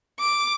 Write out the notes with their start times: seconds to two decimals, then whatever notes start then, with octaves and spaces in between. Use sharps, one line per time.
0.20 D6